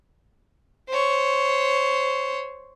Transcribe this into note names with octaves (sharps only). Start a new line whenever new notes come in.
C5 C#5